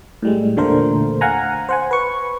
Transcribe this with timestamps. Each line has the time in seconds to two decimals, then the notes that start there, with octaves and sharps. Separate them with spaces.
0.22 A2 G3 G#3
0.56 E2 A#2 D3 A3 A#4 C5
1.21 F5 F#5 G#5 A#5
1.69 C5 F#5 G#5
1.91 B4 C#6